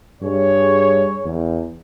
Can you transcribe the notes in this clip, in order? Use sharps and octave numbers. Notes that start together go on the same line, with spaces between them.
G2 G#4 C#5
E2